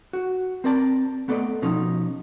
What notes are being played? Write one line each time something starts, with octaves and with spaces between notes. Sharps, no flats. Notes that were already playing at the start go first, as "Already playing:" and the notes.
F#4
C4 A#4 D5 A5
A3 B3 A4 D5 D#5
B2 F3 C#4 D#4